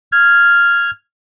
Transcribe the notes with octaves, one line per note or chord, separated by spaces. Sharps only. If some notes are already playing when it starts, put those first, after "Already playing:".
F6 G#6